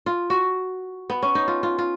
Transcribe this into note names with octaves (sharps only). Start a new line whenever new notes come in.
F4
F#4
B3
C#4
D#4
F4
F4
F4